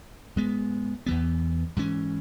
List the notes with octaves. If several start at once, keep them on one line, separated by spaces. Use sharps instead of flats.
G#2 G#3 B3
E2 E3 B3
G#2 E3 C#4